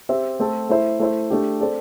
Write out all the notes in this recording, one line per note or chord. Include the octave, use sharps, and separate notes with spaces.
C4 G4 E5
A3 C4 A4
A3 E4 C5 E5
A3 E4 C5 E5
A3 D4 G4
C4 A4 D5